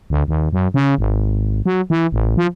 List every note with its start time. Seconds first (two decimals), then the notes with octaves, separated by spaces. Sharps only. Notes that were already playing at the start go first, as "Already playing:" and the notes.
0.10 D2
0.28 D#2
0.53 F#2
0.74 C#3
0.98 G#1
1.66 F#3
1.90 E3
2.12 A1
2.37 F3